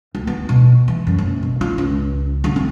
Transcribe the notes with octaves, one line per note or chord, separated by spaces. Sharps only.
D2
B3
B2
E3
F#2
F#1
B2
F4
C#2
D3
C4